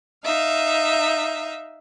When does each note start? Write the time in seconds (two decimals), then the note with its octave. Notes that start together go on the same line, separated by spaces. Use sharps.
0.24 D#4 E5 F5